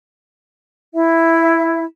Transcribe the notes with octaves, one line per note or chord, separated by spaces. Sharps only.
E4 E5